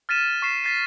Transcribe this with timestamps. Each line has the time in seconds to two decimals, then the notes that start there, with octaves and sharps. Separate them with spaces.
0.09 F6 A6 B6 D#7 E7
0.42 C#6 B6 C7 E7
0.64 A6 B6 C7